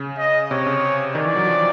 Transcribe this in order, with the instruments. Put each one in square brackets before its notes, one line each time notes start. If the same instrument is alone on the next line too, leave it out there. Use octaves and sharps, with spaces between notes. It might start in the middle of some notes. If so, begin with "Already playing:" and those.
Already playing: [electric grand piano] C#3
[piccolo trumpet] D#5
[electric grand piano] C3 [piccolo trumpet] C#5
[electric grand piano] C#3
[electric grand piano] D#3 [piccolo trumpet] D5
[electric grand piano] E3
F#3
F3